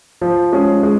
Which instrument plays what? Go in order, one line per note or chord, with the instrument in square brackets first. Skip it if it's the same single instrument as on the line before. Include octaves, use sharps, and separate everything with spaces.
[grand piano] F3
G#3 C#4 G#4
G#3